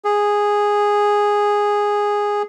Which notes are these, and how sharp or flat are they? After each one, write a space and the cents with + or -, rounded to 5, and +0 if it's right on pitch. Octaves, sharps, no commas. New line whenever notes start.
G#4 -10